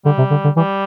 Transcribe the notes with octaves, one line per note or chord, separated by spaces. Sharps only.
D3 G3
C3
D3
D3
E3 G3